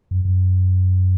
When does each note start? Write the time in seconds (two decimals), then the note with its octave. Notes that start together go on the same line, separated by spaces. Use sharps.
0.11 F#2
0.25 F#2